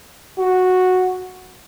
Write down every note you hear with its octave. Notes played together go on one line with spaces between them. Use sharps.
F#4